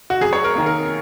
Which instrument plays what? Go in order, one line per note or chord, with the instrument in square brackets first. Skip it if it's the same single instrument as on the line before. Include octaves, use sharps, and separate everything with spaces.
[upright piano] F#4
F#2 G#4
C#5
A#4
D#3 A#3
A#4